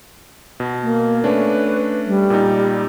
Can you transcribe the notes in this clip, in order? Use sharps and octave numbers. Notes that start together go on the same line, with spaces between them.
B2
A#3
A3 C#4 D4 B4
G3
A#2 D#4